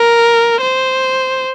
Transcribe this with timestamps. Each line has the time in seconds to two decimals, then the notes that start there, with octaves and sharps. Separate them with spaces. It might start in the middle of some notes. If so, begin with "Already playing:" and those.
Already playing: A#4
0.61 C5